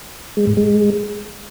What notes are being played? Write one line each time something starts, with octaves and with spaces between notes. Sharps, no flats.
G#3
G#2
G#3